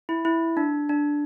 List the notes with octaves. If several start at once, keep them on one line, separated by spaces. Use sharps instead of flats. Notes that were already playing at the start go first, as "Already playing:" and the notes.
E4
E4
D4
D4